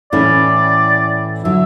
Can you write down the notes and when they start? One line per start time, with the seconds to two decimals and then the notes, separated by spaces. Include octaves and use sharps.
0.12 A2 E3 A3 C#4 D5
1.45 D3 F#3 E5